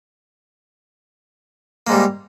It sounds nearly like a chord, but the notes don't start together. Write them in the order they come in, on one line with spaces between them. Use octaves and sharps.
A#3 G#2 G3